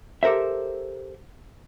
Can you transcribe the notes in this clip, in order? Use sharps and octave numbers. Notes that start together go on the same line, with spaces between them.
G4 A4 A#4 C5 E5